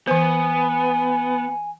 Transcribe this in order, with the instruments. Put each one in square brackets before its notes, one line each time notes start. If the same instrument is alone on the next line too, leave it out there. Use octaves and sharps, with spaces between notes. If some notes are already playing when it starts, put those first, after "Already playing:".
[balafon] E3 C5 [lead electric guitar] B3 [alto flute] G#5